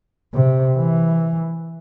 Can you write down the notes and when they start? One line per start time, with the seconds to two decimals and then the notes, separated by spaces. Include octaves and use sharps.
0.34 C3
0.77 E3